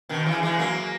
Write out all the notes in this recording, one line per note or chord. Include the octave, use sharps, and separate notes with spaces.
B2 D#3
C#3 E3
E3 G#3
F#3 A#3